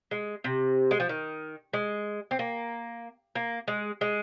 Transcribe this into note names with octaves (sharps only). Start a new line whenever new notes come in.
G#3
C3
G#3
F3
D#3
G#3
C4
A#3
A#3
G#3
G#3